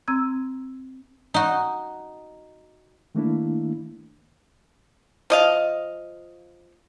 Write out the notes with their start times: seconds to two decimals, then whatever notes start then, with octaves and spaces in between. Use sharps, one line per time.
0.08 C4 A#5 E6 G#6
1.34 D#4 F#4
3.15 D#3 A3 A#3 D4 E4
5.30 F3 D#5 F5